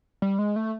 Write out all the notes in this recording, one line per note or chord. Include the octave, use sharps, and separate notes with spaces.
G3
G#3
A3